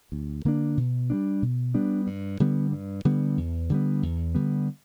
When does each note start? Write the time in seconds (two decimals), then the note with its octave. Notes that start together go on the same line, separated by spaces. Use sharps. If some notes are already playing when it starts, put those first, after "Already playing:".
0.12 D2
0.45 D3 A#3 D4
0.77 B2
1.10 G3 B3 D4
1.42 B2
1.74 G3 B3 D4
2.07 G2
2.40 D3 G3 B3
2.72 G2
3.05 D3 G3 B3
3.37 E2
3.70 D3 G3 B3
4.02 E2
4.35 D3 G3 B3